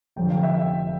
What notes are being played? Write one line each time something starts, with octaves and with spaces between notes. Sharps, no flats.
F1 F2 D3 G5
F5
E5 G5